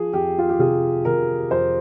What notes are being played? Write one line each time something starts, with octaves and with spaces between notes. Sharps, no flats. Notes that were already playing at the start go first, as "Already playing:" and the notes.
Already playing: F3 G#4
F2 G4
F4
G4
C3 G#4
C3 A#4
F2 C5